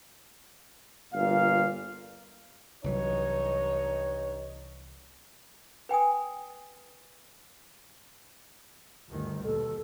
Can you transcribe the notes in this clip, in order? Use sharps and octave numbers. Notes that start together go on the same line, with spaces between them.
G1 A#2 F5
C2 G2 E3 F#3 D#4 C#5
B4 G5 G#5 D#6
G1 D2 D#3
D#2 B2 A4